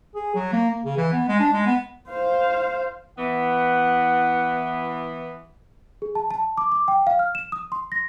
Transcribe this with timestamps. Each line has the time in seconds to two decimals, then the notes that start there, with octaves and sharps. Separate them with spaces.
0.15 G#4
0.35 F#3
0.53 A#3
0.70 A#3
0.84 C#3
0.97 E3
1.12 B3
1.28 G#3
1.40 D4
1.53 G#3
1.66 B3
2.09 C5 F5
3.19 E3 B3 F#5
6.02 G#4
6.15 A5
6.31 A5
6.57 D6
6.72 D6
6.88 G5
7.07 F5
7.19 F6
7.35 E7
7.52 D#6
7.72 C6
7.92 A#6